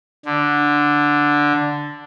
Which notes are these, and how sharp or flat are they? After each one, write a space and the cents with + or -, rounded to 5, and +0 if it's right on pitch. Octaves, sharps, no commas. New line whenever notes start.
D3 +0